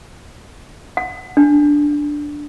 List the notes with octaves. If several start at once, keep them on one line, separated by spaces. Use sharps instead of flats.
F#5
D4